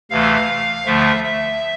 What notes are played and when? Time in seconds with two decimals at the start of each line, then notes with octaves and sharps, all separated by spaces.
0.10 D2 C3 E3 A3 F5
0.85 D2 D3 F3 A3 E5
1.23 E5